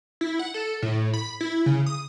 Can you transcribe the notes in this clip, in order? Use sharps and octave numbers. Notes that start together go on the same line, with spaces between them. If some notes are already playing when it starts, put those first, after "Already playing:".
E4
F#5
A4
A2
B5
E4
C#3
D#6